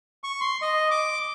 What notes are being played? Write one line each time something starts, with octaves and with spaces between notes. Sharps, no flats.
C#6
C6
D#5
D6